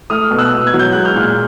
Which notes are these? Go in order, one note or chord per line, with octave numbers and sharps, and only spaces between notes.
A3 D#6 F6
B2
E6 F#6
B2
G#6
F#3
G6
G#3 F#6
F6 G6
A#2